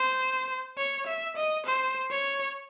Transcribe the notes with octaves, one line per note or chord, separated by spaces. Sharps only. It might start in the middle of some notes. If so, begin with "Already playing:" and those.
Already playing: C5
C#5
E5
D#5
C5
C#5